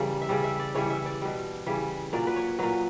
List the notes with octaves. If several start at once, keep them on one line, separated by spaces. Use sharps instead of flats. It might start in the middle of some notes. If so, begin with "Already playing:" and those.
Already playing: C#3 E3 G3 G4 A#4 D5
E5
C#3 G3 D5
E5
D5
C#3 E3 G3 C#5
E5
D5
B2 G3
C#3 E3 G3
A#2 F#3 D5
B4
C#5
A#2 F#3 B4